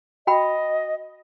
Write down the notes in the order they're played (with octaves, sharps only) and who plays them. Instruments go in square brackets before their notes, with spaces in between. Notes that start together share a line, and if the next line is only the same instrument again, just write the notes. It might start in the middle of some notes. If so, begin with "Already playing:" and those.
[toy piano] F#4 G5 B5 [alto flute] D#5